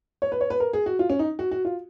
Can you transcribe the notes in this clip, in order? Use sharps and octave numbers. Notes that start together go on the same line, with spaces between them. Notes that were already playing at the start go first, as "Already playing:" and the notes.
C#5
B4
C#5
B4
A#4
G#4
F#4
F4
C#4
D#4
F#4
F#4
F4